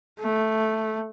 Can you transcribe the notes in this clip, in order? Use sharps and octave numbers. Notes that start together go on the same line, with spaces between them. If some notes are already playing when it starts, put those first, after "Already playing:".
A3